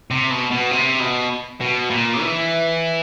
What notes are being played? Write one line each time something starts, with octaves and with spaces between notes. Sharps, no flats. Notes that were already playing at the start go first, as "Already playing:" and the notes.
C3
B2
B2
C3
B2
B2
A#2
E3